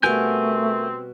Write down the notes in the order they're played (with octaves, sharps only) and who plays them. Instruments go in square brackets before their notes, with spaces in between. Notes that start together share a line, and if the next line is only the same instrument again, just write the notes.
[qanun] B2 G3 F#5 [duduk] A3 [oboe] C4 [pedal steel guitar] A#4 G#5 G6